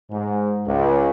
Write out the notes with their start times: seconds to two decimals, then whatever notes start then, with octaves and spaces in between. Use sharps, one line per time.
0.10 G#2
0.66 C#2